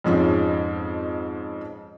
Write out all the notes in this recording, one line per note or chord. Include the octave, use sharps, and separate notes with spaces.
F2 G#2 F3 C#4